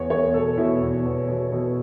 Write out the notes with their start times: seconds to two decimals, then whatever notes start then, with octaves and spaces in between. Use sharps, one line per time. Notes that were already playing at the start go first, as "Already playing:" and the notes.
Already playing: E2 C#5
0.10 E2 C#5
0.34 B2 A4
0.57 B2 E4
0.81 E2
1.05 E2
1.28 B2
1.52 B2